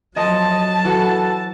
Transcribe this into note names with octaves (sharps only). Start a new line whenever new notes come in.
F3 F#3 D#5 A5
D#5
E3 F#4 A4